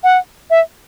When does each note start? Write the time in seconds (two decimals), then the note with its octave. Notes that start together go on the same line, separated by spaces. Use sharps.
0.04 F#5
0.50 E5